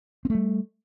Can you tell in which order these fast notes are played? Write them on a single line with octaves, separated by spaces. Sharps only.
C4 A3 G3